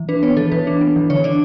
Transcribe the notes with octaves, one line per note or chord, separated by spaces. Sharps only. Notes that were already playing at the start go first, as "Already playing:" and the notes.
Already playing: E3
D4 B4
B3 C#5
E3 A4
E3 B4
D4
B3
E3
D3 C#5
D4 D5